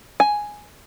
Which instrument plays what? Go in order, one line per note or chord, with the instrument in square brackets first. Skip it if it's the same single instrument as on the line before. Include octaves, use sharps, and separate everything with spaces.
[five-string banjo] G#5